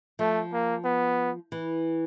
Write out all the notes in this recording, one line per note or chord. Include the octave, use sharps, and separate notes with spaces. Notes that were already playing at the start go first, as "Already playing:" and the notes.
F3 A3
A#3
B3
E3